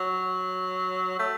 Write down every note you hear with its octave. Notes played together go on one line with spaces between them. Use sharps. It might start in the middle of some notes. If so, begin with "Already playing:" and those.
Already playing: F#3
A3